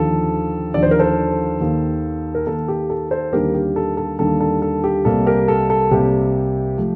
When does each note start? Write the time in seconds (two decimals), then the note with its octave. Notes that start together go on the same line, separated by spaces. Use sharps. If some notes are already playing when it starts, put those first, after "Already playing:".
Already playing: D#2 D3 F3 A4
0.74 D#2 D3 F3 D5
0.83 C5
0.91 A#4
0.99 A4 C5
1.61 D#2 D#3 A#3
2.35 A#4
2.47 D#2 D#3 A#3 A4
2.68 G4
2.90 A4
3.11 A4 C5
3.33 D#2 D3 G3 A#3 G4 A#4
3.54 G4
3.76 A4
3.97 A4
4.19 D#2 D3 G3 A#3 A4
4.40 A4
4.62 A4
4.84 G4
5.05 C2 C3 G3 A#3 A4
5.26 G4 A#4
5.48 A4
5.70 A4
5.91 C2 C3 G3 A#3 G4
6.78 F3 A3